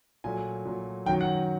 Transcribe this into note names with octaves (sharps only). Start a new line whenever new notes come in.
A#2 F#3 A3 G#5
A#2 F#3 A3
F#2 D#3 F#3 G5
F#5